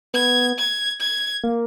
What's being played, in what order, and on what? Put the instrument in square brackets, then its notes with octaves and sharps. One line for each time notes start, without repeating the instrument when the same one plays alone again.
[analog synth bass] B3 [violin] G#6
[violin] G#6
G#6
[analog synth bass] A#3